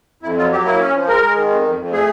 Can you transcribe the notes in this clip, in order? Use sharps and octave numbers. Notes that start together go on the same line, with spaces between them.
F2 E4
F#3 F4
F#3 G4
A#3 E4
C#4
F3
G#3 A#4
G#3
D#3
F2
F2
F2
A3 G#4